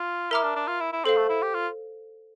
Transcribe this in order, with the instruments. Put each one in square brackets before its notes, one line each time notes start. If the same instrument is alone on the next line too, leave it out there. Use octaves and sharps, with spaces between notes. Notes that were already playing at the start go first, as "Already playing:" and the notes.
Already playing: [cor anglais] F4
[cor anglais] E4 [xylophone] A#4 E5 A#5 D6 F6
[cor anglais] D4
D4
F4
E4
E4
[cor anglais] C4 [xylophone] A4 C5 F5
[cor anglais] A3
E4
G4
F4